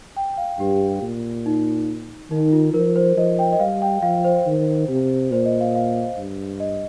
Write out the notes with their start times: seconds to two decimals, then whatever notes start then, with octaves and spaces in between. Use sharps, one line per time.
0.17 G5
0.37 F5
0.59 G2 G4
1.02 A#2
1.46 D#4
2.31 D#3 D#4
2.53 F4
2.74 F3 A#4
2.96 C5
3.17 F3 D#5
3.39 G5
3.53 D#5
3.60 G3 F5
3.82 G5
4.02 F3 F5
4.24 C5
4.47 D#3
4.89 C3
5.31 A#2 C5
5.45 D#5
5.60 F5
5.75 F5
6.18 G2
6.60 D#5